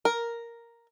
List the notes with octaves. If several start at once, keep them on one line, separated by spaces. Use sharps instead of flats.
A#4